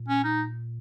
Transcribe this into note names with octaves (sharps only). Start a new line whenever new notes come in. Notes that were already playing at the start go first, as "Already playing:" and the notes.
Already playing: A#2
C#4
D#4